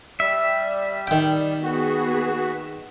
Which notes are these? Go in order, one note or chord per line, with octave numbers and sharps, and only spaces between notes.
G3 E5
D#3 G5
B3 F#4 G#4